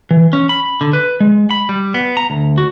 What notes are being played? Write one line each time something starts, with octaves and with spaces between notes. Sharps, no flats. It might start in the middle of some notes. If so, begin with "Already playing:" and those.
E3
C#4
B5
D3
B4
G#3
B5
G3
B3
A#5
D2
F#4